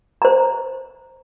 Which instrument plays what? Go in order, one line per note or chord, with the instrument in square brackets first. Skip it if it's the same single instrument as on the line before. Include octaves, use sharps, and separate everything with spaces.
[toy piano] C5 A#5